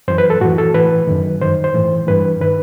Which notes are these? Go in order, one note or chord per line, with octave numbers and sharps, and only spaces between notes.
F#2 E3 C5
B4
A4
A2 E3 F#4
A4
A2 E3 B4
F#2 D#3
G2 D#3 C5
C5
A2 E3
G2 E3 B4
D#3 B4